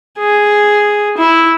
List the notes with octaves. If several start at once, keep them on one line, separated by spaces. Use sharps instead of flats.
G#4
E4